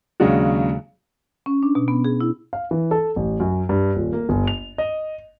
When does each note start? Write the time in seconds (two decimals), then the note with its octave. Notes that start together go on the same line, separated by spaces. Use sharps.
0.20 D#2 C#3 F#3 G#3 D4 F#4
1.46 C#4
1.63 D4
1.75 B2
1.88 B3
2.05 G#4
2.21 E4
2.53 F5
2.71 E3
2.91 A4
3.16 A1
3.40 F#2
3.69 G2
3.96 D#1
4.13 A#3
4.29 G1
4.47 F7
4.78 D#5